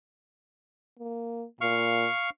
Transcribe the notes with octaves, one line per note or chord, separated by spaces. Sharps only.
A#3
A#2 F5 C#6 F6